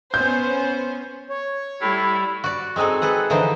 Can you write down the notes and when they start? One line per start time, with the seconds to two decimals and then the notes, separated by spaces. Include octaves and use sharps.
0.14 B3 C#4 C5 G6
1.30 C#5
1.81 A2 G3 E4
2.44 F#4 D5
2.76 G#3 C4 D#4 G#4 A4
3.02 G#4 A4 B4 F#5
3.30 D3 E3 F3 D#4 C5